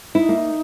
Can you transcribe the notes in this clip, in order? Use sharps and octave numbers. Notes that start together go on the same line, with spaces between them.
D#4 E4
A#3